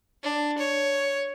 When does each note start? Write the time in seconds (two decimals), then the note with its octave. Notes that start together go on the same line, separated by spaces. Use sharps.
0.23 D4
0.58 C#5